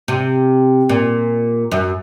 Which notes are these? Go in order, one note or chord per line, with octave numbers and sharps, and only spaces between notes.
C3
A#2
F#2